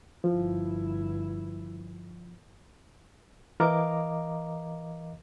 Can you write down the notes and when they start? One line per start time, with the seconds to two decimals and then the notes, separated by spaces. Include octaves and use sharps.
0.24 G1 F3 E4
3.60 E3 A#4 D#5 F5 A#5 D6